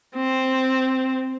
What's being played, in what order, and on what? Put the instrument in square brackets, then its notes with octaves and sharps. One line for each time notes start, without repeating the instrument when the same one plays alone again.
[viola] C4